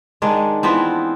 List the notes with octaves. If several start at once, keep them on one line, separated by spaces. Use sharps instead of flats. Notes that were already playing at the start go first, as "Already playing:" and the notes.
D#3 G#3 D4
E3 F3 B3 C4